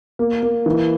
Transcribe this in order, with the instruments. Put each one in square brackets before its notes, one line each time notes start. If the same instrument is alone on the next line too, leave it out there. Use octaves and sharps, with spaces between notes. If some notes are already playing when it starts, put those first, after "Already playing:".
[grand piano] A#3
A#3
E3